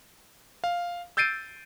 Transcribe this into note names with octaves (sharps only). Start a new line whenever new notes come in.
F5
E6 G6 A6 C7 D7 D#7